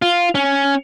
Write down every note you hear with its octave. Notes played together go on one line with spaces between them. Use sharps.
F4
C#4